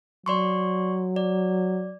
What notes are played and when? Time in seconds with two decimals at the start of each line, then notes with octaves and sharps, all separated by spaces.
0.26 F#3 D5 C6 C#6
1.16 D5